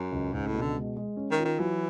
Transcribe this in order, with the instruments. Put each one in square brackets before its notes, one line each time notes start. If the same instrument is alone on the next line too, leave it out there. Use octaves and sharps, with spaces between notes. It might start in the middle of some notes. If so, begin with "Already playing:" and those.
Already playing: [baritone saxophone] F#2
[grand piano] C#2
[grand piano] C#2 [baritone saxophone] G#2
[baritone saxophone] A2
[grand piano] B2
[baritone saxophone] D3
[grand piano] G#3
G#3
C#4
[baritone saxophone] D#3
[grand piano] F4
[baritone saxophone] D#3
[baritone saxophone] E3 [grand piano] F#3